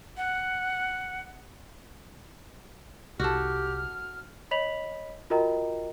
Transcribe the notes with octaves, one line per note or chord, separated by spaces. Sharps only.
F#5
C2 F#4 G4 A4 F6
C#5 D#5 B5 B6 F7 F#7
F4 F#4 A#4 D#5 G5 A#5